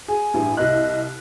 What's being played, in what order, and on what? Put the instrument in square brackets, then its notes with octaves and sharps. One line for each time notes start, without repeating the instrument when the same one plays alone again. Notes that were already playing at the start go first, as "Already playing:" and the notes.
[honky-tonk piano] G#4 [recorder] G#5
[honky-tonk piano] A1 G2
[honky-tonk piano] C2 F#6 [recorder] D#5